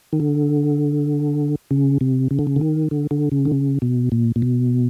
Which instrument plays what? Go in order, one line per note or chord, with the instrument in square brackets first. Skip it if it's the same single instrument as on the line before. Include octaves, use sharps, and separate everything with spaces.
[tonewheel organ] D#3
D3
C#3
C3
C#3
D3
C#3
D3
D#3
D3
D3
C#3
D3
C#3
B2
A#2
A#2
B2